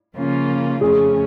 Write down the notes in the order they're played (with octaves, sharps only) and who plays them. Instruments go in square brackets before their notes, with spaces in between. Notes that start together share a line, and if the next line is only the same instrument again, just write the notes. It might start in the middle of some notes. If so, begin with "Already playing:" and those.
[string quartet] C#3 F3 A#3 C#4 F4
[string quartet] F2 C#3 F3 A3 C#4 [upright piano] G#4